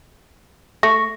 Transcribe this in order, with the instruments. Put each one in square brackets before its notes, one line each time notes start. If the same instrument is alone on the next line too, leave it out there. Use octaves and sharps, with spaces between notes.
[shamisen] A3 [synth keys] C#6 [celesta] A#6